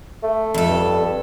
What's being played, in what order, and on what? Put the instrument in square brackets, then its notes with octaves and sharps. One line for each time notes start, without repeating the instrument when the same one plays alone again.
[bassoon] A3
[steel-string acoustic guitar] F2 A4
[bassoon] G2